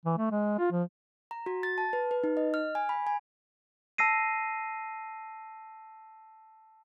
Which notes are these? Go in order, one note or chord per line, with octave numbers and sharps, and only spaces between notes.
E3
A3
G#3
F4
F3
A#5
F#4
A6
A5
B4
B4
D#4
D#5
F6
G#5
B5
G#5
A5 E6 A#6 C7 D#7